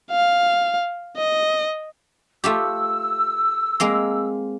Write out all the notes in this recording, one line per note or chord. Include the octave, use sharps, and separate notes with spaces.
F5
D#5
A3 F4 G4 E6
G#3 A#3 C4